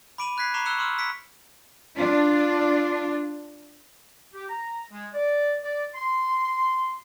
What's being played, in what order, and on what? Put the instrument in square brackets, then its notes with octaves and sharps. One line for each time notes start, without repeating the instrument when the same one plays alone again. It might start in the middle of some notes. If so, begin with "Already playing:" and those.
[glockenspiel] B5 D6 D7 D#7 F#7
B5 F#6 G#6 B6 C7
A#5 B5 C#6 D6 C7 F7
C#6 E6 F#6 C#7 E7 G7
C6 D6 E6 F6
E6 B6 C#7 D7
[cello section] D4 F4
[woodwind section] G4
A#5
G#3
D5
D5
C6